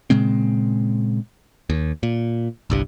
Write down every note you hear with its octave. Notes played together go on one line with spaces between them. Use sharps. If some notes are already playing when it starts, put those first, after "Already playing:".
A#2 C#3 G#3 C4
D#2
A#2
G1 C2 G2